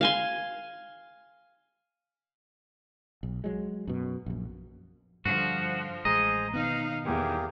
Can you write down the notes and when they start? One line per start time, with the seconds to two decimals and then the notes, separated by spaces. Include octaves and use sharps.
0.01 F5 G#5 C6
3.23 B1
3.44 F#3 G#3
3.87 F#2 B2
4.26 A#1 F#2
5.26 G2 D3 F3 F#4
6.05 A1 G#3 G#4 C5 D#5 A#5
6.54 B2 D#3 B3 D#4 F5 F#6
7.05 E2 A#3 G4 G#4